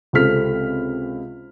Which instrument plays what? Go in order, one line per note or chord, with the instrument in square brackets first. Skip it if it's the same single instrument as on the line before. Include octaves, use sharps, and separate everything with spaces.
[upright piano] C#2 C3 C4 A4 F6 B6